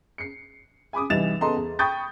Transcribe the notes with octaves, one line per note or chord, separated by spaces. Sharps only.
C7 C#7
G#5 B5 D6 D#6
C2 E3 D#4 A6 E7 F7
C#3 B3 A4 D#5 A#5 C6
E2
G5 B5 C#6 D#6 G6 A6